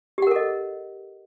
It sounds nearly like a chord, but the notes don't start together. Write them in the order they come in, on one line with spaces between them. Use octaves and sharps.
G4 F#5 A#4 A4 D#5